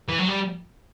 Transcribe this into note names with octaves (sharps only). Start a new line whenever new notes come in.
E3
F#3
G3